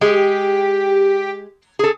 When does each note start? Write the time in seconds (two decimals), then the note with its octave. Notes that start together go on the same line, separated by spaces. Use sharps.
0.01 G#3 G4
1.79 G#4 A4